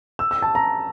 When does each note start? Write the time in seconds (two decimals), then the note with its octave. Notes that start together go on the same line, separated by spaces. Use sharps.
0.19 E6
0.31 E6
0.42 A5
0.55 A#5